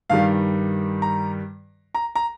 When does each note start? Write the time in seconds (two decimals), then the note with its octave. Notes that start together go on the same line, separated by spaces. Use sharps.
0.10 G2 D#3 G3 F5
1.02 A#5
1.94 A#5
2.15 A#5